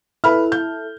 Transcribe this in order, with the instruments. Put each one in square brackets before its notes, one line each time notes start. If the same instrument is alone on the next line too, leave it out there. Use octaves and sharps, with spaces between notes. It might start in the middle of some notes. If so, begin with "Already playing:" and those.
[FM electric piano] E4 A4 [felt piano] B4 B5 F6
[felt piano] G6